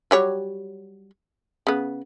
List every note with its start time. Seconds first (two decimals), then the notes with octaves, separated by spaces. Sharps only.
0.11 F#3 G3 C#5
1.67 C#3 B3